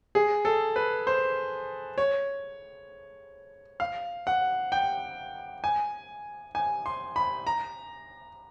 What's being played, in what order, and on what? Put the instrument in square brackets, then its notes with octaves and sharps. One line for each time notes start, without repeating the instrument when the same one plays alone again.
[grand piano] G#4
A4
B4
C5
C#5
F5
F#5
G5
G#5
G#5
C6
B5
A#5